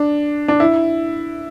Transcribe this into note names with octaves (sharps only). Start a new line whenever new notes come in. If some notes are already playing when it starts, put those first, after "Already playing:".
Already playing: D4
D4
E4